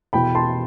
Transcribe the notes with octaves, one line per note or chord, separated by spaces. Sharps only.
E2 B2 G5 B5
B5
A5 C6